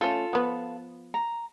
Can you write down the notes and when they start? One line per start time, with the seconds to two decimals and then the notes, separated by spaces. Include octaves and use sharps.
0.01 A3 C#4 F4 A4
0.33 F3 B3
1.14 A#5